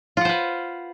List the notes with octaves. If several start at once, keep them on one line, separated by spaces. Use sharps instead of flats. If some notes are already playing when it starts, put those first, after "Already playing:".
F4 B4 C5 F#5